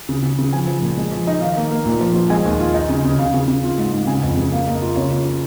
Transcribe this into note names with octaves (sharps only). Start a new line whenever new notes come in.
C#3
C#3
C#3
F3 G#5
F3
A#2
G#3
F3
D#4
D#3 F5
A#3
A#3
A#2
F3
F3
G#3 G#5
D#2
F4
D#4
C#3
C#3
C#3 F5
C#3
C#3
F4
G#2
G#2
C#3 G#5
F2
C#3
A#3 F5
A#3
D#5
F4
C#3 C#5
F4
C#4